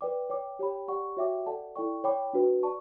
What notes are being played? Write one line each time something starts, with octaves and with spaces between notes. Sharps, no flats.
B4 D5 G5 D6
C#5 G5 D6
G4 C#5 G5 B5
G4 D5 F#5 C#6
F#4 C#5 E5 G5 D6
A4 D5 F#5 A5
E4 A4 D5 G5 C#6
C#5 G5 B5 D6
D4 F#4 B4
D5 A5 C#6